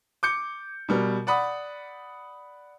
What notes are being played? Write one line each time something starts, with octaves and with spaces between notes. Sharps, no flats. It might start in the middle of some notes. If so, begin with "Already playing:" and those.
D6 G6 C#7
B2 G3 A#4
D5 F#5 B5 D#6